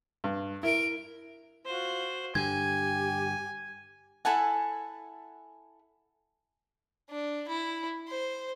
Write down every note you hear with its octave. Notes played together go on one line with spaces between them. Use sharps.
G2
E4 A#4 D7
F4 F#4 C5
G2 D3 G4 G#5 G#6
E4 A4 F#5 G#5
D4
E4
C5